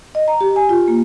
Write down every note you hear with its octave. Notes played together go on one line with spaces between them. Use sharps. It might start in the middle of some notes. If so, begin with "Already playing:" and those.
D#5
A#5
G4
G#5
F4
A#3